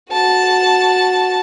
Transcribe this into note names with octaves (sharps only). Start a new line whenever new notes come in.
F#4 A5